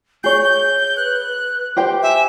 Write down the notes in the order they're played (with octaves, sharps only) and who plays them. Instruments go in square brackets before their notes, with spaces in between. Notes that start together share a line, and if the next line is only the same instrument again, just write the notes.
[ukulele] G#4 C#5 [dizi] G6
[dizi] G6
[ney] B4 [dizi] F#6
[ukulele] G4 C5 G5
[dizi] E5 [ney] G#5